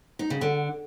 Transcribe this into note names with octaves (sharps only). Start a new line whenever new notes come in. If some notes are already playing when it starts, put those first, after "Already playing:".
D#4
C#3
D3